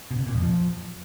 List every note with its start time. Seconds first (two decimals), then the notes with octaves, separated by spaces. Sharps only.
0.11 B2
0.19 C3
0.27 A#2
0.35 F2
0.43 F3